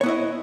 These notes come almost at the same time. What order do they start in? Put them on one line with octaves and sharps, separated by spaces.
C#5 B3 E4 D#5